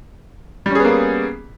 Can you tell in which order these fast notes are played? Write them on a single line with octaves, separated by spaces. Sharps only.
G3 C#4 G#4 B3 A#3